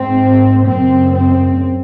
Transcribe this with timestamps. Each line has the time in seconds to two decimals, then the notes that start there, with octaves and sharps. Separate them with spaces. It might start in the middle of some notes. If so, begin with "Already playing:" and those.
Already playing: G#2 C4
0.69 F#2 C#3 C4
1.17 C4